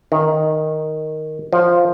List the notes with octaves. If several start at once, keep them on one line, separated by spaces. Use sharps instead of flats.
D#3
F3